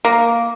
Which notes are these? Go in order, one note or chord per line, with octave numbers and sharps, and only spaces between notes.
A#3